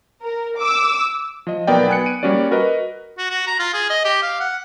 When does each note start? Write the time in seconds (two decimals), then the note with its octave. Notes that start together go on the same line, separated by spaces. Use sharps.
0.23 A#4
0.58 D6 E6
1.47 F3 D#5
1.67 B1 F#3 B3 A#4 D5 G5
1.88 B3 G#5 F#6 C#7
2.06 D7 D#7
2.23 G3 A#3 C#4 F#4 D5
2.51 F#4 A#4 B4 D#5
3.18 F#4
3.30 F#4
3.47 A#5
3.59 F4
3.74 G#4
3.90 D#5
4.04 G4
4.22 F5
4.40 F#5